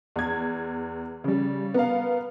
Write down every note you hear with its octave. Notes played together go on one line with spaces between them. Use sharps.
E2 G#6
C#3 G3
B3 A#4 F5